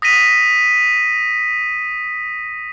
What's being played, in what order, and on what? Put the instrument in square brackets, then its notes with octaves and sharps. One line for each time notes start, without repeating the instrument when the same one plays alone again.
[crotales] D#6 A#6 B6 D#7